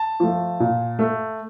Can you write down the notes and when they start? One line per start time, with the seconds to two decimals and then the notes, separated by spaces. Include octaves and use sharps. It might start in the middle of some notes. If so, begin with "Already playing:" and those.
Already playing: A5
0.20 F3 A3
0.60 A#2
0.99 A3